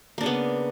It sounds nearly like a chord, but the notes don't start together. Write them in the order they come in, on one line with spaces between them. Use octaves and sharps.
A#3 D4 C#3 B3